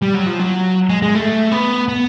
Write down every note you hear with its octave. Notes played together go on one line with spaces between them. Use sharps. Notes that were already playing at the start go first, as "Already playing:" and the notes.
G3
F#3
F3
F#3
G#3
G#3
A3
B3
B3